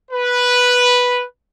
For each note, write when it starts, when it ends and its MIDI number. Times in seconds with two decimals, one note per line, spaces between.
0.12 1.24 71